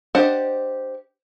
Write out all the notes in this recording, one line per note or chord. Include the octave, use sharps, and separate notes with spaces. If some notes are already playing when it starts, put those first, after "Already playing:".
D4 G4 C5 D#5 F#5